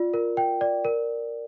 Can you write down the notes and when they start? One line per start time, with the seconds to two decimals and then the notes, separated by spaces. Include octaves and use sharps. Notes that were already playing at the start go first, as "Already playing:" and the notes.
Already playing: F4 D5
0.14 A#4
0.37 G5
0.61 D5
0.85 A#4